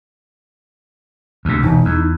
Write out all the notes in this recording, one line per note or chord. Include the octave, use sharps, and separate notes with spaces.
D2 C3
E1 D#4
E2